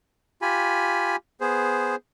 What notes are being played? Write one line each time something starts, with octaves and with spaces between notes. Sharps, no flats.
F4 G4 G#5 B5
B3 G#4 C5